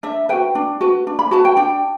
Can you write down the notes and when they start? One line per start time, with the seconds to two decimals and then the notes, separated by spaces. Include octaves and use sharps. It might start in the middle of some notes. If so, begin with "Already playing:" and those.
0.03 D4 E5
0.29 F#4 B4 G5
0.55 D4
0.81 F#4 B4
1.07 D4
1.19 B5
1.31 F#4 B4 A5
1.45 G5
1.57 D4 G5